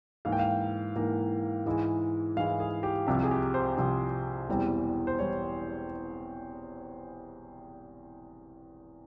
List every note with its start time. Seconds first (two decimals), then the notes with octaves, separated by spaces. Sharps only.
0.25 G#2 E3 A#3 F5
0.32 G5
0.39 F5
0.95 G#2 E3 A#3
1.66 G#2 E3 G#3 E4
2.37 G#2 E3 G#3 E4 F5
2.60 G#4
2.83 G4
3.07 C2 C3 F3 C4 G4
3.23 G#4
3.31 G4
3.54 C5
3.77 C2 C3 F3 C4
4.48 E1 E2 E3 G3 C4
5.07 C5
5.19 E3 G3 C#5